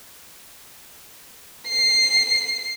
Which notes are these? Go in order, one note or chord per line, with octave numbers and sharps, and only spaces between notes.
C7